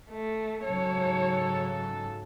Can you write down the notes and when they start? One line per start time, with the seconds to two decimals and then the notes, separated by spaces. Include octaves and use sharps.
0.10 A3
0.65 G#2 C#3 F#3 A4 C#5